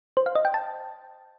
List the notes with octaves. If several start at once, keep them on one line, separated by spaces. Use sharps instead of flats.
C5
F5
D#5
G5
A5